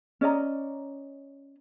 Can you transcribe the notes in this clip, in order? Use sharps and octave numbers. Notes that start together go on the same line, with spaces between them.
C#4 D5 D#5 A#5